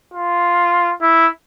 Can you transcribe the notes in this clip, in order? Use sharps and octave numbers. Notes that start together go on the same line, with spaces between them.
F4
E4